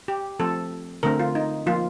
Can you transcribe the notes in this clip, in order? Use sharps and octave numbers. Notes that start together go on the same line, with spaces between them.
G4
F3 A3 C4 A4
D3 A3 C4 A#4
F4
D#4
F3 A#3 F4